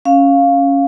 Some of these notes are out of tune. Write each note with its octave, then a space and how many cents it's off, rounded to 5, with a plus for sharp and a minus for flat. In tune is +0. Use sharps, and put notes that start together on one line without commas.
C#4 +0 F5 +0